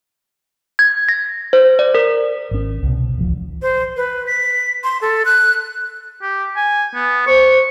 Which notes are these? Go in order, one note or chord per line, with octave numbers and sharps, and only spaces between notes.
G#6
A#6
C5
D5
A#4
G#1 C#4
C2 B2
D1 A1 F3
C5
B4
B6
C6
A4
F#6
G4
G#5
B3
C5 C#6